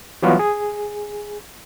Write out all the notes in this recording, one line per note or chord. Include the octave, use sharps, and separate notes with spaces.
E3 F#3 G3 B3 F4 F#4
G#4